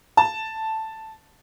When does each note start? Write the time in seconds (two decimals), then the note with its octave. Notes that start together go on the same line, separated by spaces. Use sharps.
0.17 A5